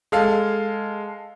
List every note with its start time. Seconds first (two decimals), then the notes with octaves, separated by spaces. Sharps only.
0.12 G#3 A4 F5